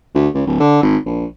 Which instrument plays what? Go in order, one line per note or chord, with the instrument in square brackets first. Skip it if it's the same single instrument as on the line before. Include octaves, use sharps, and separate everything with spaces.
[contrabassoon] D2
C#2
D1
D3
G#1
A#1